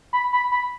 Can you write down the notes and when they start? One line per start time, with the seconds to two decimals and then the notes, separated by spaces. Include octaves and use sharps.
0.13 B5
0.33 B5
0.52 B5